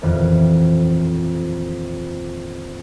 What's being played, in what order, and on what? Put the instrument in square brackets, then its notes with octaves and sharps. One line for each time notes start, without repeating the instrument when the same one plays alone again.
[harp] D#1 F2 E3 C4 A4